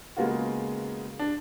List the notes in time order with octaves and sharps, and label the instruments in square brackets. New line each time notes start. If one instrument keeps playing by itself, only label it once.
[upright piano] C#3 G#3 A#3 B3 F4 F#4
D4